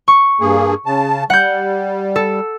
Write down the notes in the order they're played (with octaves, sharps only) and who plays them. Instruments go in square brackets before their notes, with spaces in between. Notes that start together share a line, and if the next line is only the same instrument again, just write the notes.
[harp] C#6
[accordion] G2 A#3 G#4
C#3 A5
[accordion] G3 [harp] F#5 G6
[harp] A4